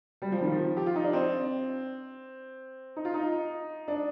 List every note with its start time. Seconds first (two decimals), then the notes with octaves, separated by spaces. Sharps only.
0.22 G3
0.32 F3
0.42 D#3
0.52 F3
0.77 G4
0.86 F4
0.96 D#4
1.04 D4
1.13 C4
2.96 D#4
3.05 F4
3.14 D#4
3.88 D4